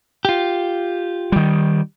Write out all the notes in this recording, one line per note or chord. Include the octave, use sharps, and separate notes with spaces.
F4 G4
D#3 G3